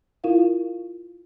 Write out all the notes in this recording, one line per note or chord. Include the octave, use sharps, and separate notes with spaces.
E4 F4 A#4 F5